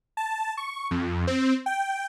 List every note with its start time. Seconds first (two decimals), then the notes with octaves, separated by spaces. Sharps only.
0.17 A5
0.57 C#6
0.91 F2
1.27 C4
1.66 G5